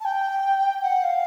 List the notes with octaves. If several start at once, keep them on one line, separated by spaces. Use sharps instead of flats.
A5
G5
F#5
F5